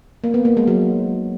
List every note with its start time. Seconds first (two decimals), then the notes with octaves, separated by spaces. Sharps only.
0.24 A#3
0.34 B3
0.45 A#3
0.57 G#3
0.67 F#3